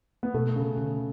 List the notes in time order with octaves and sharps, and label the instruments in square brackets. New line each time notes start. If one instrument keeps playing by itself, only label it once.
[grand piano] B3
[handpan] B2 [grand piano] A3
[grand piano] C#3 [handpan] C#4
[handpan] D3